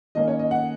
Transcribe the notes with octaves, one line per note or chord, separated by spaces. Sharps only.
D#3 A#3 C#4 D#5
C#5
D#5
F#5